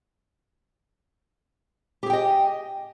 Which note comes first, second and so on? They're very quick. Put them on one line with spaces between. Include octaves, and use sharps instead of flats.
G4 G#4 G5 D#5